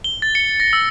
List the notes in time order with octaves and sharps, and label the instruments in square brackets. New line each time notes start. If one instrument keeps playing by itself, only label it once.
[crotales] G7
A6
C#7
A#6
E6